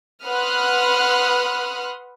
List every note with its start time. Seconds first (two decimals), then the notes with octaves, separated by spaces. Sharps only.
0.24 B4 F#5 C6 D#6 F6 F#6